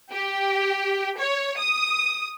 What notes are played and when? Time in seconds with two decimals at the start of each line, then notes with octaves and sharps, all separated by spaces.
0.11 G4
1.18 C#5
1.58 D#6